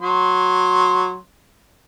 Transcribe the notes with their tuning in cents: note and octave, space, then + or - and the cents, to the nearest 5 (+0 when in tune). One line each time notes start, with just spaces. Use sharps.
F#3 -10 C6 +5